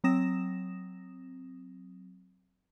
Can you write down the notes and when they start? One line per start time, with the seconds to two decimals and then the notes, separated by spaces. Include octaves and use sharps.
0.04 F#3 C4 D#6 A#6 E7